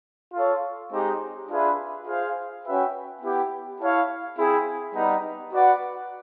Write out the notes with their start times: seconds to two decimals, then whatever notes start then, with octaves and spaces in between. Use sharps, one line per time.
0.34 F4 A4 C#5
0.91 G#3 C4 D#4 G4
1.49 D4 F4 G#4 B4 E5
2.07 F4 G#4 C5 F5
2.65 C#4 F#4 B4 E5 G5
3.22 B3 E4 G4
3.80 E4 A4 C#5 F5
4.38 C4 E4 G#4
4.94 G3 B3 D#4
5.53 F#4 B4 D5 F#5